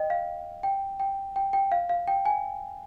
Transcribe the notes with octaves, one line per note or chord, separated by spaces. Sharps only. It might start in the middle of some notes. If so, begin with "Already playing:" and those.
Already playing: D#5 G5
F5
G5
G5
G5
G5
F5
F5
G5
G#5